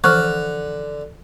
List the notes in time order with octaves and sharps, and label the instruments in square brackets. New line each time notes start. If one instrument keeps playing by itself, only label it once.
[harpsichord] D3 [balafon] E3 F3 C5 [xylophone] C#6 F6 [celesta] F#6